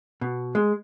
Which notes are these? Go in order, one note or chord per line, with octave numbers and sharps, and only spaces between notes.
B2
G#3